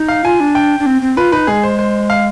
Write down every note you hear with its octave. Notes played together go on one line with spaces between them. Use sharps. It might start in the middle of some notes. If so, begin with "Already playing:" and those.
Already playing: D#4
F5
F4 G#5
D4
G5
D4
C4
C4
F4 B4
D#4 B4
G#3 G#4
C5
C5
F5